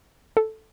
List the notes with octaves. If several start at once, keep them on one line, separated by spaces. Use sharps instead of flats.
A4